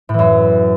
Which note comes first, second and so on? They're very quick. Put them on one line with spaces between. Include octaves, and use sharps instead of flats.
A2 E3 F#2